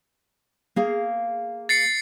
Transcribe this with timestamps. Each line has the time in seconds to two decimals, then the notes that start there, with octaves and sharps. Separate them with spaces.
0.76 A#3 G#4 F5
1.69 A6 C7 C#7